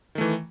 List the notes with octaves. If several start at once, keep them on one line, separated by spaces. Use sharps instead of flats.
D#3 E3 A3